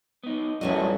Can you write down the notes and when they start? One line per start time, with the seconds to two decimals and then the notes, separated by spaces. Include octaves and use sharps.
0.23 B3 D#4
0.61 A1 F#2 F#3 G3 F4 F#4 C#5 D#5